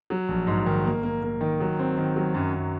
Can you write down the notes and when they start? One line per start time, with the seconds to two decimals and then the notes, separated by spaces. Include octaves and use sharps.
0.10 F#3
0.28 A#1
0.47 G#2
0.66 D#3
0.84 A#3
1.03 A#3
1.23 A#3
1.41 D#3
1.60 F#3
1.79 C4
1.97 D#3
2.16 F#3
2.34 F#2
2.54 F#2